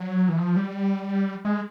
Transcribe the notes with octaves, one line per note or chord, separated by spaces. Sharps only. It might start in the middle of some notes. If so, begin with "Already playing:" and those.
Already playing: F#3
E3
F3
G3
G#3